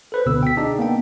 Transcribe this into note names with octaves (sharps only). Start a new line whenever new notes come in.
A4 B4 C5
C#2 B2 D3 B3 E6
G5 B6
D4 D#4 G#4 D5 D#5
A#3 B3 G5